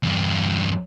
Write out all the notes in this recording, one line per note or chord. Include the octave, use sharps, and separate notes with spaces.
E2 G2